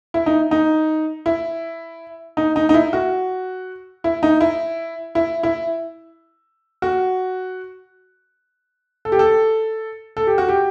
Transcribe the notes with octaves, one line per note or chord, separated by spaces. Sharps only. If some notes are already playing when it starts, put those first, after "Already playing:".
E4
D#4
D#4
E4
D#4
D#4
D#4
E4
F#4
E4
D#4
E4
E4
E4
F#4
A4
G4
A4
A4
G4
F#4
G4